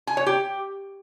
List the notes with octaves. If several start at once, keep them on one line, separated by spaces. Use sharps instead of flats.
G#5
C#5
G4